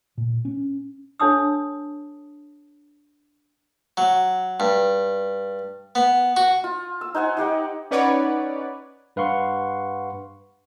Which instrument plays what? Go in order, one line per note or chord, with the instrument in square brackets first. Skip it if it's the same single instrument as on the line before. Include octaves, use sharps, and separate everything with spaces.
[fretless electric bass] A#2
C#4
[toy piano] D4 A4 C#5 A5 D#6 E6
[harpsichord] F#3
G2
B3
F#4
[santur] F4
E6
D#4 C5 F#5 G#5
D#4 G4 F#5 G5
[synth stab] C#4 D#4 B4 C#5 D5 F#5
[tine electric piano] G2 B4 F5 F#5 C6 C#6